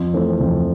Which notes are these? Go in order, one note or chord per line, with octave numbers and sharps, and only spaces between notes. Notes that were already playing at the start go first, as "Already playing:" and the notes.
Already playing: F2
E3 A3 C4 E4
F2